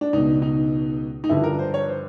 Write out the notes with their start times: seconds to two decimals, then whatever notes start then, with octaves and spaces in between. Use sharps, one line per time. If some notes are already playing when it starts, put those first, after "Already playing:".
0.01 D4
0.13 C#2 B2 D#4
0.42 D#4
1.24 D#4
1.29 G2 D3 F3 E4
1.44 A#4
1.59 C5
1.74 C#5
1.88 C5